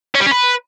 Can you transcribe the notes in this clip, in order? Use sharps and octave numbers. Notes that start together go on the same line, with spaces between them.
C#4
G3
C#4
B4